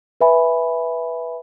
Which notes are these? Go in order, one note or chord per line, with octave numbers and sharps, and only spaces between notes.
B4 E5 G#5 B5